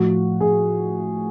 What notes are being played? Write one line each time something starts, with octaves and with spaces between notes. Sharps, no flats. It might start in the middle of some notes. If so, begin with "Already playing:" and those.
Already playing: A2 F3 F#4
G#4